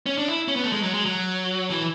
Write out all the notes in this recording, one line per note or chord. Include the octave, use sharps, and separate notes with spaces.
C#4
D4
E4
C#4
B3
A3
G#3
F#3
G#3
F#3
E3